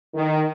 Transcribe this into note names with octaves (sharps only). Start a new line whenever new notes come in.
D#3